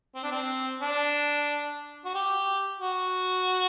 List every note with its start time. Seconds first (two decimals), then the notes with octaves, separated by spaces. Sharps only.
0.15 C4
0.23 D4
0.31 C4
0.81 D4
2.05 F#4
2.15 G4
2.80 F#4